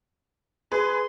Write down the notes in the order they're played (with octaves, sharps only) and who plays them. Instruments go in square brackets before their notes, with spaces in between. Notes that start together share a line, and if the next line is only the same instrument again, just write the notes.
[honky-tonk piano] G#4 B4 [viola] C6